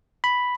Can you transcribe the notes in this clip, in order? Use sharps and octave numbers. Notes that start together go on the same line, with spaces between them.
B5